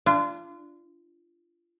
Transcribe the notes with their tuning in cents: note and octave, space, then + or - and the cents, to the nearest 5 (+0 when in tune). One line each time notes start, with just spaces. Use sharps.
D4 +0 F4 -30